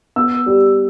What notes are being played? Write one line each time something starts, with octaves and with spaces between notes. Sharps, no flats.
B3 E6
G3